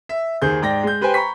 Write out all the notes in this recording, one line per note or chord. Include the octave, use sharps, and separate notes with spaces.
E5
D#2 D#3 G#4 C5 G6
G#2 D5 G5 A#6
G#3 G6
G4 B4 C5 G5 G#5
A#5 B5 C#6 B6